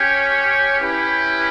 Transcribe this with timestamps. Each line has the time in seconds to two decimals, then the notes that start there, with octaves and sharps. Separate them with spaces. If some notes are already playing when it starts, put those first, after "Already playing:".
Already playing: C#4 G4 C#5 G5
0.80 C#4 E4 G4 B4